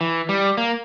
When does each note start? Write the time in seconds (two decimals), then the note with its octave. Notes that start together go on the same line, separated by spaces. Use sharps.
0.01 E3
0.29 G3
0.57 A#3